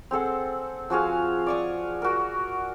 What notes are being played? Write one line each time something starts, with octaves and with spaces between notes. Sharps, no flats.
C4 G#4 A4 F#5
F3 F#4 G#4 F5
D5 C#6 D#6
F#4 A#4